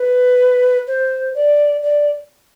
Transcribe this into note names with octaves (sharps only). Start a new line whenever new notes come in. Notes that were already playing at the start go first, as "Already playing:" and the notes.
Already playing: B4
C5
D5
D5